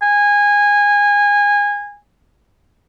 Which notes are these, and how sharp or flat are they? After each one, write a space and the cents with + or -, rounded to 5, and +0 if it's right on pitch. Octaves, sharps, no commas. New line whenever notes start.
G#5 -20